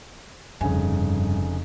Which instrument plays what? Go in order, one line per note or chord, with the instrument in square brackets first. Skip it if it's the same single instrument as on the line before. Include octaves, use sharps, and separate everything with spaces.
[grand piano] F1 C#3 G#5 [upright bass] G2